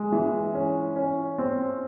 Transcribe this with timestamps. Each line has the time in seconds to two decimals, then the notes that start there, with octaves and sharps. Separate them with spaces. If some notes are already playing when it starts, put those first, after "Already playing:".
Already playing: G#3
0.12 E3
0.54 C#4
0.96 C#4
1.38 C4